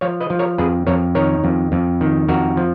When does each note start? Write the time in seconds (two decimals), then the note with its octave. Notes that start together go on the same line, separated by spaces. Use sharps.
0.01 F3 C#5 F5
0.20 B4 D#5
0.30 F3
0.39 A#4 C#5
0.58 F2 G#4 B4
0.87 F2 A#4 C#5
1.15 D#3 A#4 C#5
1.44 F2
1.72 F2
2.01 D#3
2.28 F2 F#4 A#4
2.57 F3